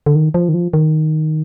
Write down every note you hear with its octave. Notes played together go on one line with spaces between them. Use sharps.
D3
D#3
F3
D#3
F3
D#3